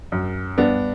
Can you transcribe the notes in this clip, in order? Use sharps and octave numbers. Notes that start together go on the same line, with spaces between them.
F#2
G2 B3 D4